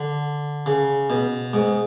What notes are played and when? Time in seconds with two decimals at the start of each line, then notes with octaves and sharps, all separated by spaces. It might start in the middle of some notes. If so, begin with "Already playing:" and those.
Already playing: D3
0.66 C#3
1.10 B2
1.53 G#2